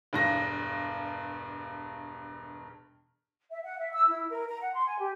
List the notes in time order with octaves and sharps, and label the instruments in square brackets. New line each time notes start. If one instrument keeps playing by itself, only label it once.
[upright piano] E1 G2 A#6
[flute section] E5
F#5
E5
E6
E4
A#4
A#5
F#5
C6
G#5
G4